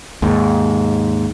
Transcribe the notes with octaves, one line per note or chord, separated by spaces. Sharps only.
D#2 G#2